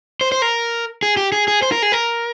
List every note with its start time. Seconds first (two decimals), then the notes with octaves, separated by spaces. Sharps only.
0.21 C5
0.32 C5
0.42 A#4
1.03 G#4
1.17 G4
1.32 G#4
1.48 G#4
1.62 C5
1.72 A#4
1.82 G#4
1.92 A#4